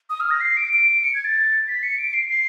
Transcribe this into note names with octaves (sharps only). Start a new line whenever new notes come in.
D#6
F6
A#6
C7
D7
D7
C#7
G#6
A6
B6
C#7
D7
C7
C7